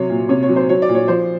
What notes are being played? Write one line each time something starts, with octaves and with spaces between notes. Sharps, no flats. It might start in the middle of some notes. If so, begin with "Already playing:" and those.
Already playing: C3 F#3 C#5
A#2
C3 C#5
C#5
F#3
C5
F#3 C#5
D5
A#2
C#5
F3 C5